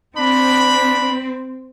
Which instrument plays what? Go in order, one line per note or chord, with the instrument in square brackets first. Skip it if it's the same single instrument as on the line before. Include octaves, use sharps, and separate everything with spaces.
[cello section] C4 [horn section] D4 B5